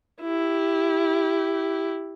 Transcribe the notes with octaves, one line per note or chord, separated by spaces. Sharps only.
E4 G4